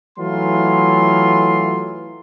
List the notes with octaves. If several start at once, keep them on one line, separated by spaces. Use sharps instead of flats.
E3 F#3 A3 F4 C6